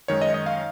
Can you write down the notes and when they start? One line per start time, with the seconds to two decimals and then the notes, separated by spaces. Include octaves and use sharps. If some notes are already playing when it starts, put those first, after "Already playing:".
0.08 F#2 D#3 G#3 C#5
0.21 D#5
0.34 D#5
0.46 F5